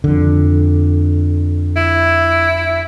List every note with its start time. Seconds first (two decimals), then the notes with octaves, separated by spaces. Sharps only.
0.04 F2 D3
1.76 E4